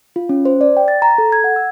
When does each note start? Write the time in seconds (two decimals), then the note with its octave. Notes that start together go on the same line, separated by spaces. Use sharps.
0.16 F4
0.29 C#4
0.45 C5
0.61 D5
0.77 G5
0.88 A6
1.02 A#5
1.18 A4
1.32 G#6
1.44 F#5
1.56 E6